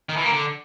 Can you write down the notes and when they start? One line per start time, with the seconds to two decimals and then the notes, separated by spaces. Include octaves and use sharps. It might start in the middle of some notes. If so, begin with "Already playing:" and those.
0.09 D#3
0.16 E3
0.24 A#3
0.31 D3